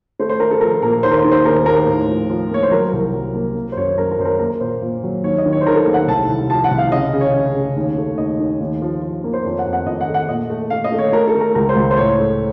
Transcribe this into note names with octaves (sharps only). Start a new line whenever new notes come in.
A3 C5
C5
A3 A#4
A4
F3 A#4
A#2 A#4
D#2 C5
A#4
C5
D#3
C5
D#2 A#4
D#2 A#4
A2
F3
F3
A#3 C#5
C5
F#3 A#4
C2 A#4
F#3
A#3
A#3
C5
F#2 C#5
F#2 A#4
A#4
F#2 C5
A#4
A#3 A#4
A#2 C5
A#2
F#3
D#2 C#5
D#5
D#3
C#5
C5
D#3 A#4
A4
A#4
D#2
F#5
C2 A5
C2
F3 A5
F#5
C2
F5
C#3 D#5
F5
C#3
C#5
C#3
C#3
D#2
A3
D#2 D#5
D#3
D#2
F3
F3
A#3
C5
F2 C#5
F#5
F2
F#5
F2 D#5
F#5
A3
F#5
A#2 D#5
A3
A3 F5
D#5
A3
C#5
A3 A#4
A4
A3
A#4
C#2 A#4
C5
C#2
C5
A2 C#5
A3